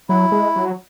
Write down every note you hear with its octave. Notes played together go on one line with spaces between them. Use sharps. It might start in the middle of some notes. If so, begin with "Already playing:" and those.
F#3 E4
G#3
F#3